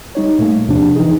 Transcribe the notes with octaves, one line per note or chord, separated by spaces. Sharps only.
G3 D#4 C#5
A#2 A3 A#3
E2 C3 F3 D4
E3 D#4 G#4